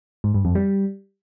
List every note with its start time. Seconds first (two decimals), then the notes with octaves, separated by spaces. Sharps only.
0.24 G#2
0.34 G2
0.45 F2
0.55 G3